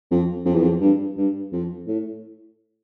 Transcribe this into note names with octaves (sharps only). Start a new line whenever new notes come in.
F2
F2
E2
F2
G2
G2
F2
A2